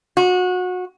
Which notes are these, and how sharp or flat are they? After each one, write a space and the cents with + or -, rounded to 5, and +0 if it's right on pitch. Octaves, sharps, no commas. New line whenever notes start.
F#4 -25